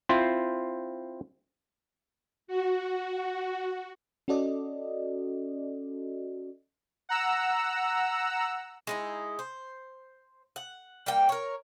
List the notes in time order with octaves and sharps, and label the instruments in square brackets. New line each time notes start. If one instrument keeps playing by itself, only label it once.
[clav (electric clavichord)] C4 E4 F4 C5
[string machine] F#4
[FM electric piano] C#4 F#4 A4 D5 D#5
[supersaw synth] F#5 A#5 E6
[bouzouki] G#3 D#4 E4
C5
F#5
G3 A#3 G5
A#4 C#5